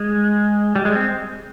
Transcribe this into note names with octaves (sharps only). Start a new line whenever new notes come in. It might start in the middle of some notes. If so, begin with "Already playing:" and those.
Already playing: G#3
G3
G#3
C4